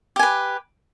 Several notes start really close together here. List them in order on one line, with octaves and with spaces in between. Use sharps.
G4 G#5 B4